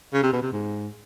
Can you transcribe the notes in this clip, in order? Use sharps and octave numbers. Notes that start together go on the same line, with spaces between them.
C#3
C3
B2
C3
G#2